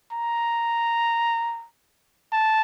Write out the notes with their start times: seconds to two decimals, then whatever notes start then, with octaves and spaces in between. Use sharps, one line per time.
0.12 A#5
2.32 A5